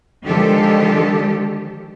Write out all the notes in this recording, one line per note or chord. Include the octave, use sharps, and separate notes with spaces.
D3 D#3 F3 G#3 G4 A4